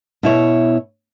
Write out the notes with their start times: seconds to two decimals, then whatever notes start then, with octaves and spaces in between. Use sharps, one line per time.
0.23 B2 E4 C#5